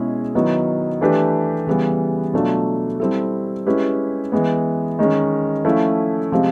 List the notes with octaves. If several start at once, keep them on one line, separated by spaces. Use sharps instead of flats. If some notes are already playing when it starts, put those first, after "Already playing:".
Already playing: B2 G#3 C#4 E4 G#4
D#3 F#3 B3 E4
E3 A3 D4 G4 B4
C#3 E3 G3 B3
B2 F#3 A3 D4 F4
G3 C4 E4 A4
G#3 C#4 E4 G4 B4
E3 G#3 B3
D#3 G#3 C#4
F3 A3 C#4 E4 A4
C3 F3 G#3 C4